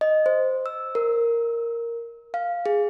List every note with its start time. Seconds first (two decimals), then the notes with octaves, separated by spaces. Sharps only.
0.01 D#5
0.26 C5
0.66 E6
0.95 A#4
2.34 F5
2.66 G#4